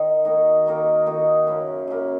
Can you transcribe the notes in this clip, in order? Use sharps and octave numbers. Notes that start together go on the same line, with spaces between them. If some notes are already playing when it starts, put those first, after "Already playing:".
Already playing: D#3
D#3 A#3 D#4 F#4
D#3 A#3 D#4 F#4
D#3 A#3 D#4 F#4
F#2 C#3 A#3
F#2 C#3 A#3